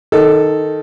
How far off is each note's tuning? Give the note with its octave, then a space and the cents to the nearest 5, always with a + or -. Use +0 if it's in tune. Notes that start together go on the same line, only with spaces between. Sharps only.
D#3 +0 A4 +0